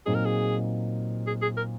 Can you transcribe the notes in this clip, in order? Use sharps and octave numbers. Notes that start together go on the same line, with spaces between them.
A#2 F#3 C4 D#4 G#4
A#4
G#4
G#4
G#4
A#4